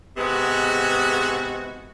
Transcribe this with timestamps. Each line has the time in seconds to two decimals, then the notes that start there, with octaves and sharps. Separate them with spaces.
0.17 G#2 C3 G#3 B3 F#4